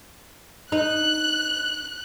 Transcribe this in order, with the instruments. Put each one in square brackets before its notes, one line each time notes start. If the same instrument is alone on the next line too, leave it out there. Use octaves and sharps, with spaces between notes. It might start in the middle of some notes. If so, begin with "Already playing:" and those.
[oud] D#4 [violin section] F#6